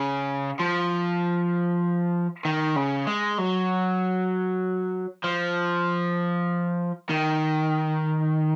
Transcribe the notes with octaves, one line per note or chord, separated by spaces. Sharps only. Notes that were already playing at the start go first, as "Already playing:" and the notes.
Already playing: C#3
F3
D#3
C#3
G#3
F#3
F3
D#3